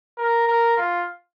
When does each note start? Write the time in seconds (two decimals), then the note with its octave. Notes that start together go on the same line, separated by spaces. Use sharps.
0.17 A#4
0.47 A#4
0.77 F4